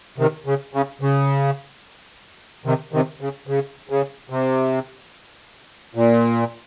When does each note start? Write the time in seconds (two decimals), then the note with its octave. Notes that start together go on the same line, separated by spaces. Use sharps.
0.18 C3 D#3
0.46 C#3
0.74 C#3
1.01 C#3
2.66 C3 D#3
2.93 C3 D#3
3.21 C#3
3.47 C#3
3.90 C#3
4.30 C3
5.95 A#2